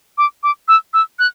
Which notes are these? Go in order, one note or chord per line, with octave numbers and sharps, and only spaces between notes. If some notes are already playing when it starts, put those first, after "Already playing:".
D6
D6
E6
E6
F#6